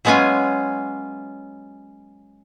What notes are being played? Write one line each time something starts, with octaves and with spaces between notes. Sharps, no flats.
F#3 G#3 B3 C#4 F4 G#5